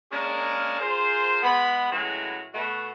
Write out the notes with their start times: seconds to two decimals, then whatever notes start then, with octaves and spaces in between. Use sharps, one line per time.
0.12 G#3 A#3 C#4 D4 G#4 A#4
0.80 F4 G#4 A#4 C5
1.43 G#3 B3 B5
1.91 A2 E3 F#3 G#3 C#4 F#4
2.54 B2 A3 F#4